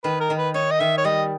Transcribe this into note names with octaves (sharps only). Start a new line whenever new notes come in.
D#3 B4
A#4
D#3
B4
D#4 C#5
D#5
D#3 E5
C#5
G3 D#5